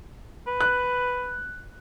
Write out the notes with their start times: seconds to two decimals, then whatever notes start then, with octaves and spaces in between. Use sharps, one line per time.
0.47 B4
0.61 F#6